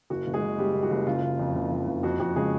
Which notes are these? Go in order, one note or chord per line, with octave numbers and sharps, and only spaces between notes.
F#1 F#4
F#1
G#3 G#4
F#1
F#1 G3 G4
F#1
F#4
F#1
C#3 F4
F#1
F2
F#1
F2
F#1
F2 F#4
F2 F#4
C#3 G#3 G#4